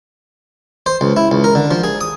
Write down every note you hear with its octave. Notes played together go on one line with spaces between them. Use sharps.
C5
C#2
E4
C#2
A#4
D3
F3
G#4
D#6